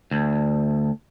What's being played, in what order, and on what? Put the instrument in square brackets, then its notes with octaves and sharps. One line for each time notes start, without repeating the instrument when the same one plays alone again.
[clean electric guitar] D2